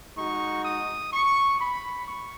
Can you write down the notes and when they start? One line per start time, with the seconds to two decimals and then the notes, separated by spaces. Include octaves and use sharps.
0.17 G#3 D#4 F#4 C#6
0.65 D#6
1.13 C#6
1.60 B5
2.08 C#6